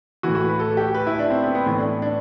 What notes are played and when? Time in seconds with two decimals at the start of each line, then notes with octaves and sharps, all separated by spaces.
0.23 A2 E3 F#4
0.35 F#4
0.47 B4
0.60 A4
0.77 G4
0.94 B4
1.07 E4
1.19 D4
1.30 C4
1.42 B3
1.55 B3
1.66 A2 E3 B3
1.78 D4
2.02 D4